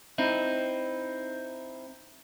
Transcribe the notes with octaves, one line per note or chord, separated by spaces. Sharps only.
C4 D#4 E4